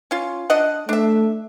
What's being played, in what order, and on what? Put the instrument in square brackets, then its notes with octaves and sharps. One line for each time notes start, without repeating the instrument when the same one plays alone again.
[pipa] C#4 F4
D4 D#5 F#5
[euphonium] A3 [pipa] D4 E5